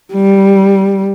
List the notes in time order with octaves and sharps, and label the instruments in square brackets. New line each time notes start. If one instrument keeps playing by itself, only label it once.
[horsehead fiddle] G3